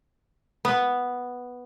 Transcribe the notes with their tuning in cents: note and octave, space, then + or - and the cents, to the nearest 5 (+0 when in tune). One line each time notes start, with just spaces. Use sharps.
B3 +0